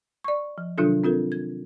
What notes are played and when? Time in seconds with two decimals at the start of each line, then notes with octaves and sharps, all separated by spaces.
0.24 D5 C#6
0.58 F3
0.78 C3 D#3 F#3 D4 F4 A4
1.04 C4 F4 A4 A#4
1.32 G#6